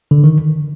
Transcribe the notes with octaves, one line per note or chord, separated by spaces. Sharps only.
D3
D#3